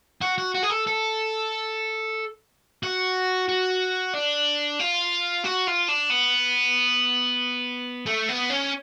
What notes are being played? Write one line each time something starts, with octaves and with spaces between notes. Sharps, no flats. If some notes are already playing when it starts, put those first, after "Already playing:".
F#4
F#4
F#4
G#4
A4
A4
F#4
F#4
D4
F4
F#4
F4
D4
B3
A3
B3
C#4